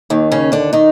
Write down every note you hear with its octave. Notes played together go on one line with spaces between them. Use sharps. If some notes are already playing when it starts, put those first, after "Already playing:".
D#2 D#3
C#3 C#4
D3 D4
D#3 D#4